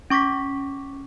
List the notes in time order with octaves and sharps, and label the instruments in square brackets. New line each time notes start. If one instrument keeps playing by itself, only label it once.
[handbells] C#4 C#6 D6 A#6 B6